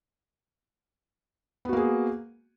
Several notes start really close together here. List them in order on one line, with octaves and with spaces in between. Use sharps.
B3 F#4 A#3 G#4